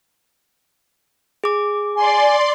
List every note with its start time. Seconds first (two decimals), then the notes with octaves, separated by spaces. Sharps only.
1.44 G#4 D6
1.96 D5 G#5 C6